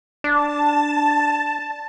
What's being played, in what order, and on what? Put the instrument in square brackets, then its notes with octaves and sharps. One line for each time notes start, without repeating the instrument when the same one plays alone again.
[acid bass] D4 [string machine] A5